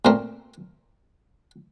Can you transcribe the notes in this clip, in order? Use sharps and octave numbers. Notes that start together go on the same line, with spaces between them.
A#2 A3 C4 A#4